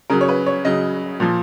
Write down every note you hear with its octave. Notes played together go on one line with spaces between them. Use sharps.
C#3 F#3 A#4
C#5
B4
C#5
C#3 F#3 D#5
A#2 F3